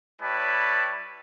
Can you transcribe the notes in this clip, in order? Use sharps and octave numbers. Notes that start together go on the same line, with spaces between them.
G3 E4 B4 C#5 A5